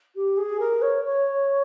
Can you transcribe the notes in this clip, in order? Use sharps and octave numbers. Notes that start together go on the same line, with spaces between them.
G4
G#4
A#4
C#5
C#5